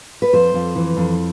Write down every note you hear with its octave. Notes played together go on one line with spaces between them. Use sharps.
B4
F2 C5
F2
E3
F2